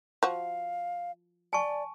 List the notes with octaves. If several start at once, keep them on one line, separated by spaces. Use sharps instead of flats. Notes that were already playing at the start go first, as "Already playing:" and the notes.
F3 F#4 F5
D5 G#5 A5 C#6